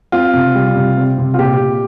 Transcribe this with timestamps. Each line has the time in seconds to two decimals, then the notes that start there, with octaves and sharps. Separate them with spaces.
0.12 C4 F4
0.34 C3
0.55 G3
0.76 C3
0.97 C4
1.18 C3
1.34 F4
1.39 A#2 G4
1.60 A#2